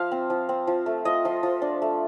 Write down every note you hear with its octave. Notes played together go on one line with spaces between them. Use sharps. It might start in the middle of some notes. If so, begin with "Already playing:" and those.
Already playing: F3 F5
C4
F3
C4
F3
A3
F3 D#5
F3
F3
D4
A3